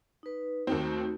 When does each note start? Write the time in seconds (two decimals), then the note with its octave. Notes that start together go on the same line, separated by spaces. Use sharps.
0.23 D#4 B4
0.67 D#2 D#3 A3 C4 D#4 F#4